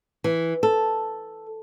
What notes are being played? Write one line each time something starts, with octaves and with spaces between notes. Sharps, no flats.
E3
A4